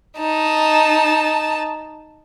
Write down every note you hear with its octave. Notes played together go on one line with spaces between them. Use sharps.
D#4 A5